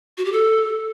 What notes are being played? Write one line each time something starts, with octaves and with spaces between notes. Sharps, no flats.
F#4
G4
A4